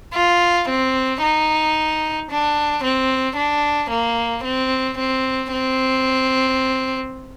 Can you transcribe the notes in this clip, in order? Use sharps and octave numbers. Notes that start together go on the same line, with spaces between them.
F4
C4
D#4
D4
C4
D4
A#3
C4
C4
C4